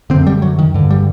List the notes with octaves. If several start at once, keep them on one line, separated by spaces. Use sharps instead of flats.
F#2 D3 C4
G3
F#3
D#3
G2 D3
G3